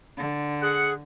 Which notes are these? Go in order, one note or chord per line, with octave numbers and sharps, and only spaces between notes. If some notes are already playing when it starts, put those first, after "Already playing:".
D3
G#4 F#5